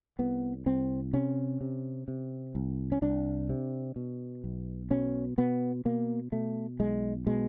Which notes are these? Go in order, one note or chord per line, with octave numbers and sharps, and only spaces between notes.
C2 B3
C2 C4
C3 C#4
C3
C3
C2
C#4
C2 D4
C3
B2
B1
B2 C#4
B2 B3
B2 A#3
B2 A3
B1 G#3
B2 G#3